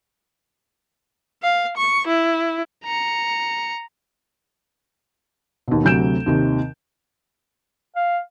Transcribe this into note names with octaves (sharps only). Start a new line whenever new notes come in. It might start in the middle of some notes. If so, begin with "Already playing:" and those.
F5
C#6
E4
A#5 C#7
D#2 B2
D2 C3 F#3 G6 D7 E7
D#2 C3 D#3
F5